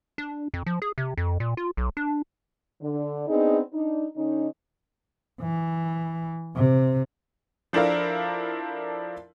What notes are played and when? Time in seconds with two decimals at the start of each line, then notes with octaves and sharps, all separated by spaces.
0.18 D4
0.54 F2
0.66 F3
0.82 G#4
0.98 C3
1.17 F2
1.40 A#2
1.57 F4
1.77 B1
1.97 D4
2.81 D3
3.28 B3 C4 D4 D#4 G#4
3.72 D4 D#4
4.15 D3 C#4 D#4
5.41 E3
6.56 C3
7.73 F3 D4 E4 A4 A#4 F5